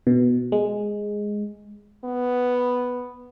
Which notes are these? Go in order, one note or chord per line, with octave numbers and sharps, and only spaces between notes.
B2
G#3
B3